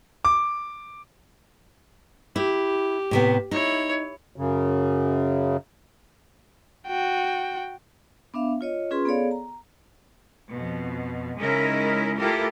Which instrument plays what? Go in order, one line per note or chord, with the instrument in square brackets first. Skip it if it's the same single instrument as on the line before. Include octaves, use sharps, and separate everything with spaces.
[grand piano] D6
[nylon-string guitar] E4 [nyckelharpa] G4
[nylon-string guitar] A2 C3 B3
[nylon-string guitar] D#4 [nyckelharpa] E4 C#5
[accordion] F#2 C#3
[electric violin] F#4 G5
[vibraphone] B3 D4 E5 F5
F4 C#5 D#5
C#4 F4 G#4 B4 C6
B3 G#4 A4 C#5 D5 F5
A#5
[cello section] F2 B2
C#3 G#3 C#4 D#4 E4 A#4
A3 E4 F4 G4 A4 A#4